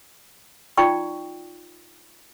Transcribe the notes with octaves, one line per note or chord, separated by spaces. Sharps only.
D#4 F4 D5 G5 C#6